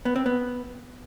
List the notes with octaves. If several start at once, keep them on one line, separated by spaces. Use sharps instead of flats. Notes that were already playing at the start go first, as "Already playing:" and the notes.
B3
C4
B3